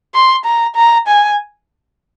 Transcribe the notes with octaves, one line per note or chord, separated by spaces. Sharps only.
C6
A#5
A#5
G#5